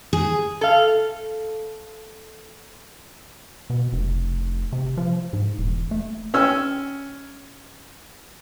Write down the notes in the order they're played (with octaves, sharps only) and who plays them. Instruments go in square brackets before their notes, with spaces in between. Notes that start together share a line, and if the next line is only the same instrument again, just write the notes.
[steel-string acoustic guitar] G#4
[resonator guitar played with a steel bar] A4 F5
[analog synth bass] B2
F1
C3
F3
G#2
E1
A3
[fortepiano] C#4 E6 F6